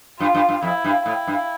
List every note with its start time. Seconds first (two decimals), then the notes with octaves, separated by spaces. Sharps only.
0.20 G2 F4
0.35 G2
0.49 G2
0.62 F2 E4
0.84 G2
1.06 A2 E4
1.27 G2